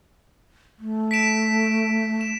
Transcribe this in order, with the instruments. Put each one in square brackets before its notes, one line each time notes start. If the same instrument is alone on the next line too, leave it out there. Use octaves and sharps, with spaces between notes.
[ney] A3
[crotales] B6 D7 E7
E7